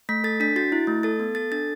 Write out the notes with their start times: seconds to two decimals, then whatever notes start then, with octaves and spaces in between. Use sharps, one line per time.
0.09 A3 B6
0.24 A4 A6
0.40 D4 B6
0.56 F#4 A6
0.72 E4
0.87 A3
1.03 A4 A6
1.20 B3
1.35 A4 A6
1.52 D4 A6